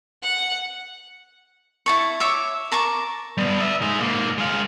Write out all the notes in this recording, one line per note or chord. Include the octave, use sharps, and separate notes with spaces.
F#5
E4 A5 C#6
C#5 E5 D6
A#4 A5 C#6 D6
G3 B3
D5 E5
G#3 D#4
G#2 A#3
G#3 F5